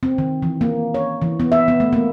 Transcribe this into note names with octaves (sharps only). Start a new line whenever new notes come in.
C4
D#3
E3
A#3
C#5
E3
B3
E5
B3
A3
A#3